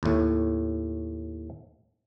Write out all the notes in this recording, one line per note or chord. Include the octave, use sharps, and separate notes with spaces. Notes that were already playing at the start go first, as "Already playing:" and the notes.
D#2 A2